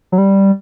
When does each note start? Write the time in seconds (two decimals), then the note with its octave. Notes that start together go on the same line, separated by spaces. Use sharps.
0.12 F#3
0.18 G3